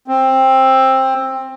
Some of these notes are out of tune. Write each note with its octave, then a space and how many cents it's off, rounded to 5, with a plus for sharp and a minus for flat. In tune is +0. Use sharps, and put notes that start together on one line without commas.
C4 +15